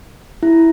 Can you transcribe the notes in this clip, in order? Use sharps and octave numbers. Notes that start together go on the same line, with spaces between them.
E4